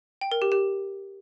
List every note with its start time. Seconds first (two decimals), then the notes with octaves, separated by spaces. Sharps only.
0.21 G5
0.32 A#4
0.42 G4
0.52 G4